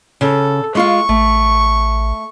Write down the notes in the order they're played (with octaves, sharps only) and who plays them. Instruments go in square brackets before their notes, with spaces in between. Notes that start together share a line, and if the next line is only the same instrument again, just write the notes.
[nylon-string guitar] C#3 [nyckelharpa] A4
[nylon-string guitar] G#3 F4 F5 [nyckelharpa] C#6
[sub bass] A1 [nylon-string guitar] A3